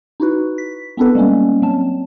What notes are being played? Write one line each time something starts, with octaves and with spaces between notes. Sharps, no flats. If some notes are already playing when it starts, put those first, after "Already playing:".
D#4 E4 F#4 B4
B6
B3 C4 D4 E4 A4 B4
G3 G#3 A#3 C#4
F#3 C4 A5